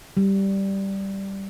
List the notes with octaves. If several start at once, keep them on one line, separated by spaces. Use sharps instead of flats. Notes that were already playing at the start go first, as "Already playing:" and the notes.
G3